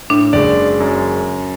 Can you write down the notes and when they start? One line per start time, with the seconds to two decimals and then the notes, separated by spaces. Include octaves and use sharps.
0.10 A2 D4
0.33 F#1 G#3 D5
0.80 F#2